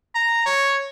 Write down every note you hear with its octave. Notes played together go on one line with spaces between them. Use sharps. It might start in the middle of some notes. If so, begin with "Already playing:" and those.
A#5
C#5